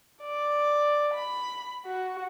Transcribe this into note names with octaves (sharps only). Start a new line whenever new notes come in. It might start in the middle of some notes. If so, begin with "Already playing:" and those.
D5
B5
F#4